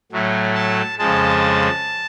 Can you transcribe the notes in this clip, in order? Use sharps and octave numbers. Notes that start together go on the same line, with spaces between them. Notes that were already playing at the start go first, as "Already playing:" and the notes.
A2 F#3 A3
A5
F2 C#3 F3 G#3 A5